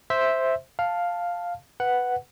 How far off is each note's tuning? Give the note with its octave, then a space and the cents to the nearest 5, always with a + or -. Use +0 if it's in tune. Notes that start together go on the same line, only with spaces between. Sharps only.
C5 +0 E5 -5
F5 +5 A5 +0
B4 +5 F#5 +0